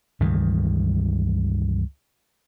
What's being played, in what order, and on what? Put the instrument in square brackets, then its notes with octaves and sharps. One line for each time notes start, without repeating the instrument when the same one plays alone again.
[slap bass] C#2 G2 D#3 E3